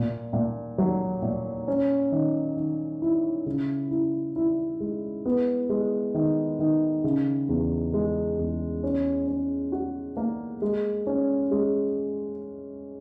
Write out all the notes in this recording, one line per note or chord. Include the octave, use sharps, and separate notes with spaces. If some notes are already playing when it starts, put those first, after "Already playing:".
Already playing: A#2
A#2
F#3
A#2
C#4
D#3
D#3
E4
C#3
E4
E4
G#3
B3
G#3
D#3
D#3
C#3
E2
G#3
E2
C#4
C#4
F#4
A#3
G#3
C#4
G#3